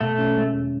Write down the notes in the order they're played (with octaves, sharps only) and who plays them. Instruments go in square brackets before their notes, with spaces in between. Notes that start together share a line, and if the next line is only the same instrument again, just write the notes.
[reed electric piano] B2 [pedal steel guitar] A3
[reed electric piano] C#4
G#3
E2